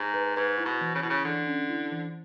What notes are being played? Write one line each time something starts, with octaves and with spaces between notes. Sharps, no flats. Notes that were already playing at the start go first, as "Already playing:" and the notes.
Already playing: G#2
B4
G#2 B4
E4
B2
E3
C#3
B2 E4
C#3
D3 E3
C#4
E4
E3